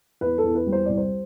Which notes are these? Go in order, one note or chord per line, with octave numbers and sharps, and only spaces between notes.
E2 B4
A4
E2
B4
G3
C5
C2 D5
C5